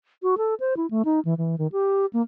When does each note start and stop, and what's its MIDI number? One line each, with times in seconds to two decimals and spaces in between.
0.23 0.35 66
0.38 0.54 69
0.60 0.74 72
0.77 0.86 64
0.91 1.03 57
1.05 1.20 63
1.25 1.34 52
1.38 1.56 52
1.58 1.67 51
1.72 2.06 67
2.13 2.22 58